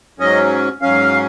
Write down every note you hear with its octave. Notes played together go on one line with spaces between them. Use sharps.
G#2 F#3 C#4 D#5
G#2 F#3 C#4 F5